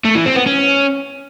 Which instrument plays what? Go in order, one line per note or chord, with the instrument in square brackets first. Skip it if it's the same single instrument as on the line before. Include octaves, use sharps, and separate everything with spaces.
[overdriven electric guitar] A3
E3
C4
B3
C#4